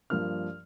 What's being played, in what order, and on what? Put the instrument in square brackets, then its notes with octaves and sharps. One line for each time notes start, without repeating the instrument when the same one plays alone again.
[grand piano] G2 F3 A#3 D4 F6